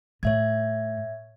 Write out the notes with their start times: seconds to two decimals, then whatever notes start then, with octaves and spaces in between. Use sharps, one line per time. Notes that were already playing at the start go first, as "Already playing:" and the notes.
0.23 A2 C#5 E5 G#6